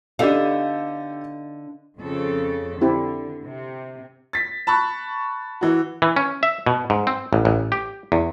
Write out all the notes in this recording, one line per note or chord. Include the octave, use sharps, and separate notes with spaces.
D3 B3 D4 D#4 G4 A4 D#5 F5
F2 C#3 A4
D3 C4 E4 G4
C3
A6 B6
A5 B5 C#6 F#6
E3 F#4
E3
C#4
E5
B2
G#2
C4
A1
A1
G4
E2